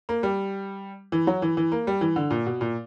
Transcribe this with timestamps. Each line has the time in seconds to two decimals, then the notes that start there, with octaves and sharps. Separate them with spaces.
0.09 A#3
0.23 G3
1.12 E3
1.27 F#3
1.42 E3
1.57 E3
1.72 A#3
1.87 G3
2.01 E3
2.16 D3
2.31 A#2
2.46 B2
2.61 A#2